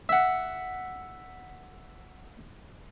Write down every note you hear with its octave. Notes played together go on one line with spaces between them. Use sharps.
E5 F#5